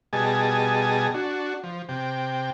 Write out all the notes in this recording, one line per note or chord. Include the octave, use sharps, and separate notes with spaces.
B2 G3 G#4 D#5 G#5 A5
D4 F#4
F3
C3 G5